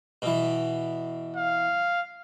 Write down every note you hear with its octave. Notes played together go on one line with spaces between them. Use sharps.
B2 E3
F5